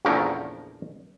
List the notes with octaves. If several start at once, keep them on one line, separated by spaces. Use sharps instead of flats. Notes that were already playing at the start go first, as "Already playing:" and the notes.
A#1 E2 C#3 F3 A3 A#4